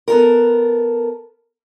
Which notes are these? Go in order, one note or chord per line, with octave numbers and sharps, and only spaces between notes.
B3 A4 A#4